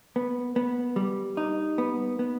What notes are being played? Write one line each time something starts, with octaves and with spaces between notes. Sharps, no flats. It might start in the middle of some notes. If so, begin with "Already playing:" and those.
B3
B3
G3
D#4
B3
B3